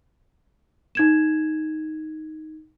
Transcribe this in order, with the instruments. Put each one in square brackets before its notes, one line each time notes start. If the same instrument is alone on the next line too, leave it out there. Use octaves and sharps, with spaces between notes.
[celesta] D#4 G#6 E7